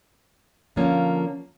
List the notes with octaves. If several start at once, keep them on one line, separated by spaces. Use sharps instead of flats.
D3 F3 A#3 C#4